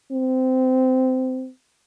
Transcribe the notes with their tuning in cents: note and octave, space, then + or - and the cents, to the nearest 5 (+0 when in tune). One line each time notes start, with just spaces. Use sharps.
C4 -20